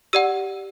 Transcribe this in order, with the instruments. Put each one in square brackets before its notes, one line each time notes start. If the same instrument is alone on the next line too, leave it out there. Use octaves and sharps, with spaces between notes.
[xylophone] G4 D5 F#5 E6